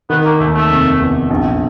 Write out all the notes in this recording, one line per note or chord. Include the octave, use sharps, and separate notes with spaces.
D#3 B3
A#3
D#2 A3
A3
F1
E2
A#1